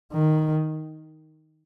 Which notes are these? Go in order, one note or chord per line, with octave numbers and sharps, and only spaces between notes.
D#3